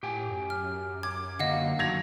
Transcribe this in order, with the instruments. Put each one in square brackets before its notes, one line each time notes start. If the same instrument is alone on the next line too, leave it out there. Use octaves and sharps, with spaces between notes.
[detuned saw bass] A2 [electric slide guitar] G4 G5 G#5
[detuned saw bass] F#2
[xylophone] F6
[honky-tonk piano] D6 [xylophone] G#6
[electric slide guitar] D3 A#3 [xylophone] D#5 F5 F#5
[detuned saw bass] G1 [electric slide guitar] F#2 D#3 F#3 [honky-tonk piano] G#6 A#6 F7